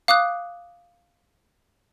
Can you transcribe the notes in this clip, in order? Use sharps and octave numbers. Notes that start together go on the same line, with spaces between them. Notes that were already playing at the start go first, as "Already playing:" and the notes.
F5 D6 D#6 F#6